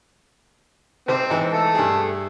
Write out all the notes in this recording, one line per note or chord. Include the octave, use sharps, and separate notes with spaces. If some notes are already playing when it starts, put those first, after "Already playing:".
G#1 C4 C5 D6
G#2 E3
A3 A4
G2 G#4